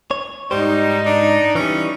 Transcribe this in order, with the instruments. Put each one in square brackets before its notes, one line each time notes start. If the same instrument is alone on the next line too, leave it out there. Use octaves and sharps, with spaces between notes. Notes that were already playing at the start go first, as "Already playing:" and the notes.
[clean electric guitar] C#5
[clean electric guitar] G#2 C5 [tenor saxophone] G3 [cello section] D#4
[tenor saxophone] D4
[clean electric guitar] E3 G3 [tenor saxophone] C#4